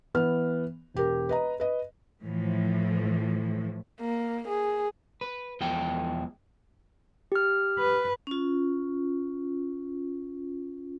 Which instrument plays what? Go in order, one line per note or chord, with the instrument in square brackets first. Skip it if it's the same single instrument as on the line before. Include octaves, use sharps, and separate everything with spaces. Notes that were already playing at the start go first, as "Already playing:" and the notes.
[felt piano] E3 B3 F6
E1 G4 A#4
B4 D#5 A#5
B4 D#5
[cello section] A2 E3 F3
[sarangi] A#3
G#4
[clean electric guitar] B4
E2 F3 G#3 G5
[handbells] G4 F6
[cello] B4
[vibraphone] C#4 F4